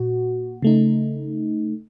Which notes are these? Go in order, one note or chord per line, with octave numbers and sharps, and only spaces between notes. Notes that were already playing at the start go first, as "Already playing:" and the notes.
Already playing: A#2 F#4
C#3 A3 D#4